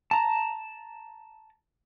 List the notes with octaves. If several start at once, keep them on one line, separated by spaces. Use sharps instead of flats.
A5 A#5